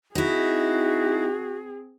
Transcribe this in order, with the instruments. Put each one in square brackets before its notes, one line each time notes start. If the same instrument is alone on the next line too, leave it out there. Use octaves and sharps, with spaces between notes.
[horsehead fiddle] C4 G#4 [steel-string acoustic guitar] D#4 E4 [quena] F#4